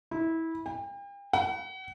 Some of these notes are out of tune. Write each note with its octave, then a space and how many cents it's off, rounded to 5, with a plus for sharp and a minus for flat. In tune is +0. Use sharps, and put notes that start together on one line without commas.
E4 -20
G5 +40
F#5 +35